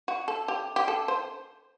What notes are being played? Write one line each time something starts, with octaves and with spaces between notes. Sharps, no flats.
F#4
A4
G4
G4
A4
C5